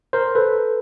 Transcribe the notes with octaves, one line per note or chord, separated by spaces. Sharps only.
A#4 C5
A4 B4